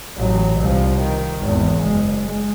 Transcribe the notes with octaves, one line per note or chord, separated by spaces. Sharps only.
A1 F#3
C2 F3
D#3
G#1 E2
F#1 G#3
G#3